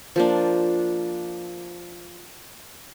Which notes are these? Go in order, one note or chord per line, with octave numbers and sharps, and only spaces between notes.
F3 A#3 D4